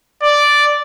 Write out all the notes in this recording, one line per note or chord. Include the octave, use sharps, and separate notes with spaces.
D5